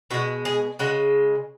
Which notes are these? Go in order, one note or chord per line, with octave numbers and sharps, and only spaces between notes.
B2 G#3 F#4
G#4
C#3 G#3 F#4